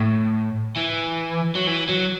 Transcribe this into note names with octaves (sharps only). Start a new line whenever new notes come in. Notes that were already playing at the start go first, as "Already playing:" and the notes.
Already playing: A2
E3
F#3
E3
F#3